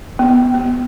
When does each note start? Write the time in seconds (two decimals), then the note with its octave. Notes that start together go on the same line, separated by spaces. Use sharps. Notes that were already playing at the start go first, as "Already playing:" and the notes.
0.19 B3
0.54 B3